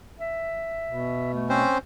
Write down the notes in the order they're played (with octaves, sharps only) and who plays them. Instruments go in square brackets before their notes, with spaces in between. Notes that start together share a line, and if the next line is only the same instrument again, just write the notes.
[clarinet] E5
[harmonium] B2
[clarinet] A3
[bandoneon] C4 C#4 C5